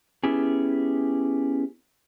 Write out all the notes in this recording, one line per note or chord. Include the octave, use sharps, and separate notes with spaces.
B3 C#4 E4 G4 G#4